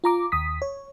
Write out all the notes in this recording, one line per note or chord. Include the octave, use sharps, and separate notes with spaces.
F4 A#5 D6
D#2 D#6 B6
C#5